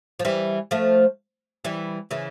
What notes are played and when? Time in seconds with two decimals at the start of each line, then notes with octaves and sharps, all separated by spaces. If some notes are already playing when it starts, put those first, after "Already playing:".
0.20 F3
0.25 E3 G3
0.71 F3 A3
1.65 E3 G3
2.11 C#3 E3